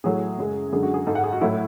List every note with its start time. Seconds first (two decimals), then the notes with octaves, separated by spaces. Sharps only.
0.04 A2 F#3 A3 G#4
0.38 F#2 C#3 G#3
0.73 F#2 D3 G#3 G#4
0.83 F#4
0.94 G#4
1.07 G#2 G#3 A4
1.15 F#5
1.23 G#4
1.33 F#4
1.41 A2 F#3 A3 E4